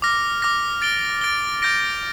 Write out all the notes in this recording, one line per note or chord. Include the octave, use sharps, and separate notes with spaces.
D6 F6 A#6
D6 F6 A#6
A6 D7 G7
A6 D7 G7
D6 G6 A#6 D7